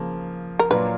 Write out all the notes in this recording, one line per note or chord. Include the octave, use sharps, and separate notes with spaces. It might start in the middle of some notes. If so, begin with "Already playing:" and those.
Already playing: C#3 F3 A#3
A#4
A#2 F#3 A#3 D4 F4 B4